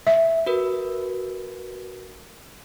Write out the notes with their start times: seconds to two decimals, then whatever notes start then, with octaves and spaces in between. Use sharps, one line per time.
0.07 E5
0.46 F#4 A#4 B4